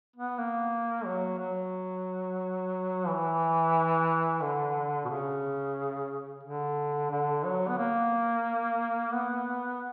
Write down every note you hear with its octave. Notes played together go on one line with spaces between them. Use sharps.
B3
A#3
F#3
F#3
E3
D3
B2
C#3
D3
D3
F#3
B3
A#3
B3